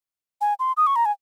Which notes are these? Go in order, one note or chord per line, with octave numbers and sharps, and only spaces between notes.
G#5
C6
D#6
C#6
A#5
G#5